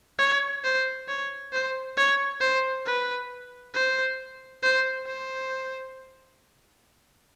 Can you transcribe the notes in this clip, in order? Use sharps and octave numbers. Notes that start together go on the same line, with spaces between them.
C#5
C5
C#5
C5
C#5
C5
B4
C5
C5
C5